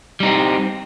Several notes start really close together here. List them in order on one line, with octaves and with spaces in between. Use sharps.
G3 D#4 C4